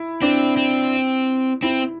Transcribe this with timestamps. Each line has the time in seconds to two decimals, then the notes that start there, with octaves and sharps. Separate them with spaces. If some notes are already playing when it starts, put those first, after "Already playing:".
Already playing: E4
0.22 C4 D4
0.57 C4
1.62 C4 E4